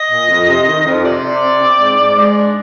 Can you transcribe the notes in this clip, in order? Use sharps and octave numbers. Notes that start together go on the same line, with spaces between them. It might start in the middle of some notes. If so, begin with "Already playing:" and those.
Already playing: D#5
A#2
F2
C3
D#3
F2
C3 D5
C3
C4
C4
G#2
G#2
G#3
D4